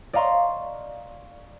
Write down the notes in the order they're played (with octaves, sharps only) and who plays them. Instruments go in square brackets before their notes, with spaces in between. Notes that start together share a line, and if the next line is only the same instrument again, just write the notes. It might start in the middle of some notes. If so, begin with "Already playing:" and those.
[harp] D5 D#5 F5 A#5 C6 C#6